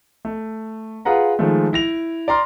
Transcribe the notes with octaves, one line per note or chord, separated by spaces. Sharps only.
A3
F4 G#4 B4 F#5 A#5
D#3 F3 G#3 A3
E4 A#6 F7
D5 A#5 C6 F6